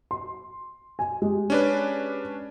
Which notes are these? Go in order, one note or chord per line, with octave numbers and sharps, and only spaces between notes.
C6
G#5
G#3 G4
C#4 D4 B4